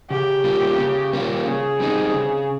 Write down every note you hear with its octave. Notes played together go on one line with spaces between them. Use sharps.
C#3 G4
G3 A#3 C#4 F4
C#3
G3 A#3 C#4 F4
C#3 G#4
G3 C4 D#4
C#3